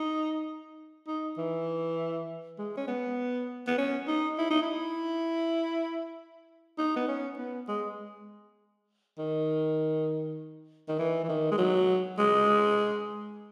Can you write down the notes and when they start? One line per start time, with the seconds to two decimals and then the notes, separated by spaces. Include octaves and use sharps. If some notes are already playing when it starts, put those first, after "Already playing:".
Already playing: D#4
1.07 D#4
1.38 E3
2.58 G#3
2.77 C#4
2.88 B3
3.67 B3
3.78 C#4
4.08 D#4
4.38 E4
4.51 D#4
4.62 E4
6.78 D#4
6.96 B3
7.08 C#4
7.38 B3
7.68 G#3
9.18 D#3
10.89 D#3
10.99 E3
11.24 E3
11.29 D#3
11.51 G#3
11.58 F#3
12.18 G#3